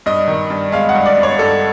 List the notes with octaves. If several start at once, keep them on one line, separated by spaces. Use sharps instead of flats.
G2 D#5
D#3
G2
G#3 F5
F#5
G2
D5
G2
C#5
G2 A4